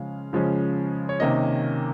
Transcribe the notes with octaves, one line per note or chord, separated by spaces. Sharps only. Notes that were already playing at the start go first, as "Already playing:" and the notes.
Already playing: C#3 F3 G#3 C#4 F5
C#3 F3 G#3 C#4
C#5
C3 D#3 A#3 C#4 D#5